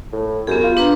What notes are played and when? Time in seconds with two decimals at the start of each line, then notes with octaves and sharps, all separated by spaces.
0.13 A2
0.47 F#2 B3 G4 G#4
0.64 F4
0.77 D4 B4 A#5